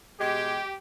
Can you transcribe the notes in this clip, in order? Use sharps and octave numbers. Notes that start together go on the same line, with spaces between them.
B2 G#3 G4